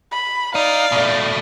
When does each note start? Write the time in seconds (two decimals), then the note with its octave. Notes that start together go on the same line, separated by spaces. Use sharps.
0.11 B5
0.55 D#4 D5 F5
0.92 B2 A3